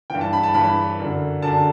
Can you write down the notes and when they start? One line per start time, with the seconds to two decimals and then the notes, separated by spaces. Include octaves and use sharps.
0.10 G2 E3 G5
0.21 A5
0.33 B5
0.43 A5
0.54 G2 E3 B5
0.99 F#2 D3
1.42 F#2 D3 A5